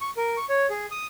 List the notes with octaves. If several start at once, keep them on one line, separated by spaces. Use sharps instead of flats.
C#6
A#4
C#6
C#5
G#4
D#6